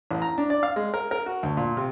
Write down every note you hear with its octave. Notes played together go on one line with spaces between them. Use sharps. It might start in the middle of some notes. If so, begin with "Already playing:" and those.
A1
A#5
D4
D5
F5
G#3
A#4
A#4
F#4
D2
A#2
C3